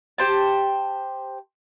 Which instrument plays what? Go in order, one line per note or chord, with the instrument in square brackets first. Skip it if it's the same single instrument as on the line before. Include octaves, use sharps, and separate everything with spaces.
[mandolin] G4 C5 A5